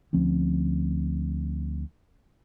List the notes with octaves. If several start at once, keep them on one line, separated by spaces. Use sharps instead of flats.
D2 F3 C4 C#4